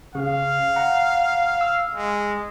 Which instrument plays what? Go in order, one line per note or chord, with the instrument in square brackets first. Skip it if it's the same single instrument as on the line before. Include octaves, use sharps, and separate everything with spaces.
[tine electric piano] C#3 [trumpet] F5
[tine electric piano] F#5 A#5
E6
[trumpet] G#3